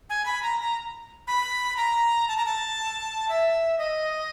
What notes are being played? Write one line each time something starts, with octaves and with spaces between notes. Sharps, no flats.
G#5
B5
A#5
A#5
B5
A#5
A5
A#5
A5
E5
D#5